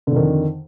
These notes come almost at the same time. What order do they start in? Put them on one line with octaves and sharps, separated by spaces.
D3 F2 D#3